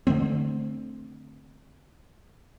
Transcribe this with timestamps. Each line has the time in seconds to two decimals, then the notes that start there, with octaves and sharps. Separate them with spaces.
0.07 D3 E3 A3 C4